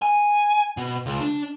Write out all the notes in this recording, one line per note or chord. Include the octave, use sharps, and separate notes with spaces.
G#5
B2
C#2
D4